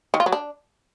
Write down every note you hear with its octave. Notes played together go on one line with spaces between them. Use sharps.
D#3
F4
F#3
D4